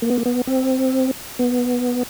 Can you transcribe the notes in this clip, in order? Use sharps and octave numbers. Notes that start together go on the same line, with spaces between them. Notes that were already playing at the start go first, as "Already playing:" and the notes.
A#3
B3
A#3
B3
C4
B3